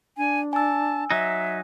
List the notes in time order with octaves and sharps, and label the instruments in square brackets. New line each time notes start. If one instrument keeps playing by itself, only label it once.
[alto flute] D4 [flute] G#5
[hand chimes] G#5 E6 [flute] A5
[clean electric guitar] F#3 D#4 [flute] E5